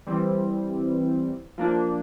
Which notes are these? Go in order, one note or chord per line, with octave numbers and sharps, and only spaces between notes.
E3 G3 C4
F3 A#3 D4